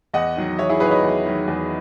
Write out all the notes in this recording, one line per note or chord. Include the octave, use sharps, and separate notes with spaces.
E2 D#5 F#5
D#3 F#3
E2 C#5 E5
E4 G#4
D#3 F#3 G#4 B4
C#5
B4 D#5
E2
D#3 F#3
E2